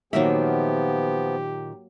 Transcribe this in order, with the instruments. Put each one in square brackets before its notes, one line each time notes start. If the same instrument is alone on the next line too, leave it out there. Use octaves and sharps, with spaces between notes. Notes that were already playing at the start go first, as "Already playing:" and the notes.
[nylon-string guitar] A#2 D#3 E5 [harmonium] F3 B3 [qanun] F#3 A#3 [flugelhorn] G4